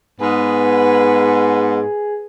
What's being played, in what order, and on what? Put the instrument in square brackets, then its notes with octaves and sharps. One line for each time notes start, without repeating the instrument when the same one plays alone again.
[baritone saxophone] G#2 [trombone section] B3 [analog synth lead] G#4 [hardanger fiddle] B4